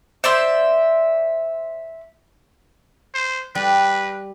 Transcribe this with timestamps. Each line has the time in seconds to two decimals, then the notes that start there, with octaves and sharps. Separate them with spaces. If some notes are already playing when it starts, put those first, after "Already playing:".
0.24 C5 D5 E5 C6
3.14 C5
3.55 G3 B4